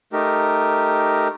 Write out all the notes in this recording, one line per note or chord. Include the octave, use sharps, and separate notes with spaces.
A3 D#4 G4 A#4